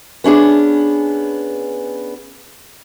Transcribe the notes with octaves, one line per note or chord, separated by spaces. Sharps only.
B3 C#4 D4 G#4